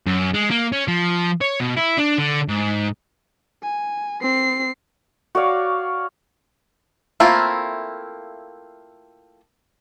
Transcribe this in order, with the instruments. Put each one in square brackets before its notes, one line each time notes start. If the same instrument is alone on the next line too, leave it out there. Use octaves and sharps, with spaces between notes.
[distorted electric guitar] F#2
G#3
A#3
C#4
F3
C#5
B2
E4
D4
D3
G#2
[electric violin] G#5
C4 C7
[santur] F#4 C#5 D5 F5
[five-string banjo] A3 A#3 C4 E4 F4